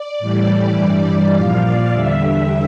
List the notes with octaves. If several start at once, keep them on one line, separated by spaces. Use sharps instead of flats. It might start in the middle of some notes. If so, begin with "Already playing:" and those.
Already playing: D5
A2 E3 G3
G2 E3 G3
A#2 F3 F5
D5
E2 D3 G3 E5